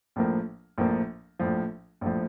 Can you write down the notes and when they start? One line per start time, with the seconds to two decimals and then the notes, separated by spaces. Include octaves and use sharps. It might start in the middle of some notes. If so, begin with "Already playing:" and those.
0.16 A#1 A2 F3 A#3
0.78 A#1 A2 F3 A#3
1.39 A#1 A2 F3
2.01 A#1 A2 F3